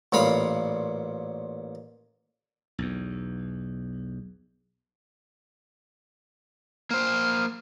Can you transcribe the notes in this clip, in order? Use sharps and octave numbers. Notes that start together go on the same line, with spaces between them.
A1 A#2 F5 B5 D#6
B1 E2
A#3 C5 F6